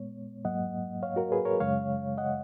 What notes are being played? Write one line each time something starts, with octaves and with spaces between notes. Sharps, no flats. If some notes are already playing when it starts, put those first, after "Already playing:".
Already playing: A#2 G#3 B3 C#5
G#2 F#3 A#3 D#5 F#5
C#5 F5
F#4 A#4
G#4 B4
A#4 C#5
F#2 C#3 G#3 C#5 F5
D#5 F#5